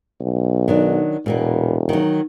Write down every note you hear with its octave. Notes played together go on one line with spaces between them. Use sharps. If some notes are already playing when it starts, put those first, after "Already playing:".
B1
D#3 F#3 D4
E1 A#2 A#3 B3
D#3 F#3